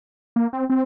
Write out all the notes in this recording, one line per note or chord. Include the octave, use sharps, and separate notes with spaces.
A#3
C4
C4